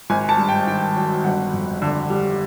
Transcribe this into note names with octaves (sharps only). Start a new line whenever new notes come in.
G#1 G#5
A5
G2
G5
D#3 G5
F#3
G1 F#5
F2
D3
G3